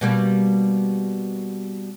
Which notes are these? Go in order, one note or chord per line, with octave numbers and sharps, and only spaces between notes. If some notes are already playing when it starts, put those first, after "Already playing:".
B2 G3 A#3